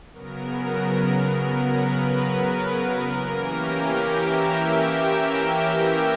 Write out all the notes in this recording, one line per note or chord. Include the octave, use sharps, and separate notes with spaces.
C#3 F#3 B3 A#4
B4
E3 A#3 C#4 A#4
G4
A#4
E5
G5